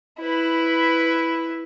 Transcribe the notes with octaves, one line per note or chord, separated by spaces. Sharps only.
E4 B4